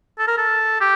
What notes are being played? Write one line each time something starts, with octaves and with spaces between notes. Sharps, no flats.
A4
A#4
A4
G4